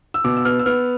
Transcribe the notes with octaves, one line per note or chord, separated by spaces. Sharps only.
E6
B2 D6
E6
B3 F6
E6
B3 F6